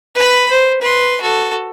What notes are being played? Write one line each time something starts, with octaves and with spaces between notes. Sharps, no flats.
B4 B5
C5
B4 C6
F#4 A4